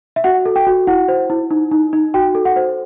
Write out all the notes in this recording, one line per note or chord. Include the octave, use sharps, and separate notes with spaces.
E5
F#4 F#5
A4
G5
F#4
E4 F#5
C5
E4
D#4
D#4
D#4
F#4 G5
A4
F#5
C5